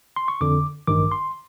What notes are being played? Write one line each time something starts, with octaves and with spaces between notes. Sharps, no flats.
C6
C#6
F2 D3 D6
A1 G2 D#3 D6
C6